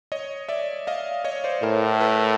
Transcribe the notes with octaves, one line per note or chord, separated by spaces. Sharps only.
C#5 D#5
D5 E5
D#5 F5
C#5 D#5
C5 D5
A2 A#4 C5
A4 B4